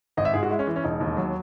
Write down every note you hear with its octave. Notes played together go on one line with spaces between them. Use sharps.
G#1 D#5
E5
G#2 G#4
F#4
G#3 E4
C#4
E3
C#4
E1 D#4
D#2
F#3